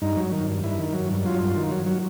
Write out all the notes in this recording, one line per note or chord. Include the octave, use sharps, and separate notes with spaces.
G2 D#4
F#3
D#3
G2
G2 E4
D#3
F#3
G2
F#3 F4
G2
D#3
F#3
F#3